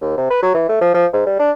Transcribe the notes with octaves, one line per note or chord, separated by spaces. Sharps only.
D#2
C3
B4
F#3
E3
A3
F3
F3
G#2
G3
D4